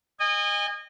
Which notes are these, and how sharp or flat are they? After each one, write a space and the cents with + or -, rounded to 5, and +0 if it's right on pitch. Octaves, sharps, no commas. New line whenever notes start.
D#5 -25 G#5 -35